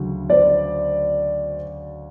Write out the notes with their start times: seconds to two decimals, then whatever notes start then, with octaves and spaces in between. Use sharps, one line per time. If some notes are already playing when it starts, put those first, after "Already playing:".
Already playing: D2 C#3 F#3
0.30 C5 D5